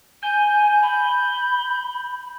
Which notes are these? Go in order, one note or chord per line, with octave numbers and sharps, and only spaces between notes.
G#5 G6
B5